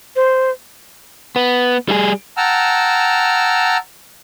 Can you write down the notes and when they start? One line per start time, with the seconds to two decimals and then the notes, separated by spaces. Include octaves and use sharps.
0.16 C5
1.36 B3
1.88 G3 G#4
2.37 F#5 G5 A5 A#5 E6 F6